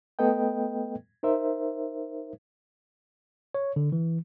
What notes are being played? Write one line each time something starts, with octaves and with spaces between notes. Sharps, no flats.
A3 B3 A4 B4 D#5 G5
D#4 A#4 C5 E5
C#5
D3
E3